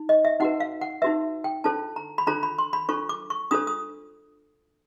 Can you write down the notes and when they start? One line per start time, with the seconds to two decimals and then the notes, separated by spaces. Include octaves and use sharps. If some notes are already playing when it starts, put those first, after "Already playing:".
Already playing: D#4
0.09 D#5
0.25 E5
0.40 D#4 F#4 B4 F#5
0.60 F5
0.81 F#5
1.02 D#4 F#4 B4 E5
1.44 G5
1.64 D4 F4 A4 C5 A5
1.96 A#5
2.18 B5
2.27 D4 F4 A4 C5 A#5
2.43 B5
2.58 C6
2.73 B5
2.89 D4 F4 A4 C5 C#6
3.09 D6
3.30 C#6
3.51 D4 F4 A4 C5 D#6
3.67 D#6